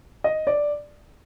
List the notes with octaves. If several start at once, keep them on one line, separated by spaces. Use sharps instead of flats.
D#5
D5